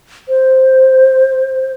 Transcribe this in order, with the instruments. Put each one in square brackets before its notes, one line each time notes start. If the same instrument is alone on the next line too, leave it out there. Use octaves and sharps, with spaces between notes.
[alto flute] C5